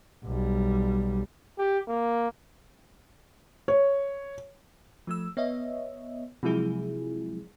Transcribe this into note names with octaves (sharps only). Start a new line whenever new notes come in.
B1 G3
G4
A#3
C#5
F3 A3 E6
B3 C#5 D#5 E5
C3 F3 F#3 G#3 E4 G#4